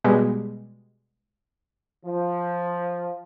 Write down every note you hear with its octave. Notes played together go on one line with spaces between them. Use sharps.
B2 G3 G#3
F3